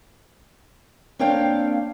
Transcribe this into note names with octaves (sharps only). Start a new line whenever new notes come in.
A#3 C4 D4 C#5 F5 G5